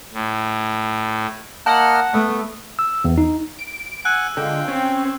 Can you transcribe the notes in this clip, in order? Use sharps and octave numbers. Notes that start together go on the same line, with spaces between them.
A2
A#3 D#5 F#5 A5 F6
A3 B3
E6
E2
D#4
D7
F#5 G#5 E6 F#6
D3 G#3 F4 G5
C4 C#4